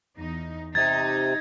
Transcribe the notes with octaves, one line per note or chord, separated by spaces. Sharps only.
E2 D#4
C3 D#4 G#6 A6